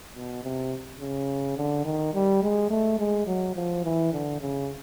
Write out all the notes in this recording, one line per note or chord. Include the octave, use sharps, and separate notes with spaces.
B2
C3
C#3
D3
D#3
G3
G#3
A3
G#3
F#3
F3
E3
D3
C#3